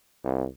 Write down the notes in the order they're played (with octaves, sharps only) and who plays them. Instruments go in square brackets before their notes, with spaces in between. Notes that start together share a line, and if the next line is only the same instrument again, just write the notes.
[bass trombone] C2